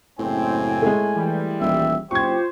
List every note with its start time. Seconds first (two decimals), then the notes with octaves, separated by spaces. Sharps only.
0.19 F#1 A2 C4 G#5
0.82 G#3 A3
1.16 E3 G3
1.61 D#1 E5
2.11 F#1 F4 G4 C5 C#6 G#6